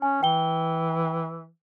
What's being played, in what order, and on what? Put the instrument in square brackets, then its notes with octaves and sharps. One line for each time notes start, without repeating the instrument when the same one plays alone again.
[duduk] C#4 [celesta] G#5
[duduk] E3 [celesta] G5 G7